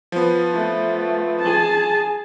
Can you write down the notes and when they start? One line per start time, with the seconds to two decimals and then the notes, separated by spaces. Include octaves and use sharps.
0.12 F3 B3
0.54 A3
1.41 G#4 A5